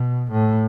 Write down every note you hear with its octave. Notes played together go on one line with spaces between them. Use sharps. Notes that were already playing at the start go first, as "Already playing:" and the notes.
Already playing: B2
A2